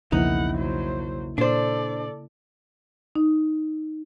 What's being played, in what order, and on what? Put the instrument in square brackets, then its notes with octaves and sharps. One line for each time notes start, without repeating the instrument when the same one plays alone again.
[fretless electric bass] B1 E2 F3 [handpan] C#3 A#3 E4 [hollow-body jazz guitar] D#4 [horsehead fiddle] F#5
[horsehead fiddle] F#3 C5
[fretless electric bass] A#2 [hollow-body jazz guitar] D4 C5 [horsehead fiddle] A4 D5
[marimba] D#4